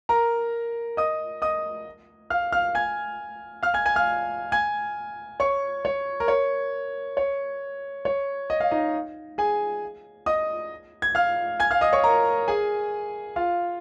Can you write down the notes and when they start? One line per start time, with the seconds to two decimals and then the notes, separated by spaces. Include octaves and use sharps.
0.09 A#4 A#5
0.97 D#5 D#6
1.42 D#5 D#6
2.30 F5 F6
2.52 F5 F6
2.75 G#5 G#6
3.63 F5 F6
3.74 G#5 G#6
3.86 G#5 G#6
3.96 F5 F6
4.52 G#5 G#6
5.40 C#5 C#6
5.85 C#5
6.20 A#4
6.28 C#5
7.17 C#5
8.05 C#5
8.50 D#5
8.60 F5
8.71 D#4 D#5
9.38 G#4 G#5
10.26 D#5 D#6
11.02 G#6
11.15 F5 F6
11.60 G#5 G#6
11.71 F5 F6
11.81 D#5 D#6
11.93 C#5 C#6
12.04 A#4 A#5
12.48 G#4 G#5
13.36 F4 F5